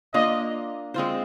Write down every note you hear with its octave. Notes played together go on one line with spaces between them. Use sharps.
A#3 D4 F4 D#5
G#3 C4 F4 C5